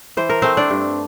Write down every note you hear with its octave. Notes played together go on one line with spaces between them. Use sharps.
E3 C5
A#4
A3 C4 C5
D4 D5
G2